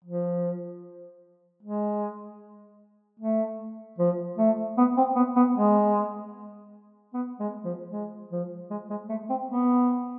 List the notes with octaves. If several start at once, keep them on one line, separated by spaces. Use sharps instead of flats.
F3
G#3
A3
F3
A3
B3
C4
B3
B3
G#3
B3
G#3
F3
G#3
F3
G#3
G#3
A3
C4
B3